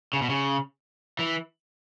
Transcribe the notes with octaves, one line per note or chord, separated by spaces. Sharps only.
C#3
B2
C#3
E3